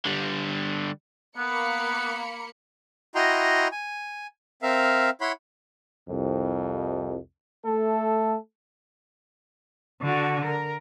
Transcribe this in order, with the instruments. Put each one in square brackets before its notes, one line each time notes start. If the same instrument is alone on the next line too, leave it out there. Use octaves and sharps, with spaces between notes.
[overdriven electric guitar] D3 G3
[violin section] A#3 B5 C#7 [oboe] B3
[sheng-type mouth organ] E4 F#4 D#5 G5 A#5 C6
G#5
C4 A#4 E5 F5
E4 C#5 F#5 B5 C6
[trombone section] C2 F2
A3 A4
[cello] D3 F#4
A#4